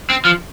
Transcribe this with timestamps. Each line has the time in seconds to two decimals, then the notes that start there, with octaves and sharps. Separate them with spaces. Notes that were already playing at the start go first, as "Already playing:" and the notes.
0.10 C4
0.25 F3